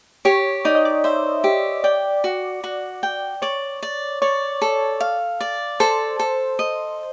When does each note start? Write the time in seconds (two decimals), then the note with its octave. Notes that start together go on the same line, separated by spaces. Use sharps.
0.25 G4 C#5
0.65 D#4 D5
0.75 D#5
0.85 D5
1.04 C5 E5
1.44 G4
1.84 D5 G5
2.24 F#4
2.64 F#4
3.03 G5
3.42 C#5 D5
3.83 D5
4.22 C#5 D5
4.62 A4
5.01 F5
5.41 D5
5.80 A4 C5
6.20 A4
6.59 D#5